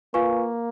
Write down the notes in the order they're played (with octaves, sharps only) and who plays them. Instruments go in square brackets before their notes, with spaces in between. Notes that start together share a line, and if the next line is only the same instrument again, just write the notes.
[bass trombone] A#3 [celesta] F4 B4 F5 G#5 C#6